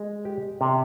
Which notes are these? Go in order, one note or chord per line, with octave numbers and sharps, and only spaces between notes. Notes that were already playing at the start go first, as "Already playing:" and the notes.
Already playing: G#3
G4
C3